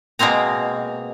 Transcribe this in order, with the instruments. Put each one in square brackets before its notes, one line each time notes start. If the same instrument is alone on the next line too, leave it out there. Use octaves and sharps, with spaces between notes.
[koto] B2 G#3 A#3 C4 A#5